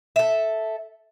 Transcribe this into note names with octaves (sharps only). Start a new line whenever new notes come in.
A4 E5